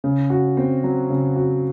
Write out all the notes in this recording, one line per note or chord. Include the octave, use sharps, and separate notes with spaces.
C#3
F#4
C4
F#3
C#3
F#4